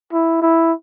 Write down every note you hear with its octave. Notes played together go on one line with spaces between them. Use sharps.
E4
E4